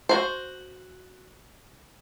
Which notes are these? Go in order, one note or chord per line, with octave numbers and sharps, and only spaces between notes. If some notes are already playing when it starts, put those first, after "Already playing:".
F#4 C5